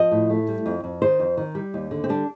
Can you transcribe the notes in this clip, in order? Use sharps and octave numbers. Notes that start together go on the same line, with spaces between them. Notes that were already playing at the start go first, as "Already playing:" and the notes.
Already playing: F3 D#5
A2
A3
G3
F2
F2
D#3 C5
F2
D#3
G3
D#2
D3
C4
G3 D4